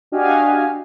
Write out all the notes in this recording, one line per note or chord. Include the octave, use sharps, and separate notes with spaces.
D4 F#4 G4 D#5 F5 G#5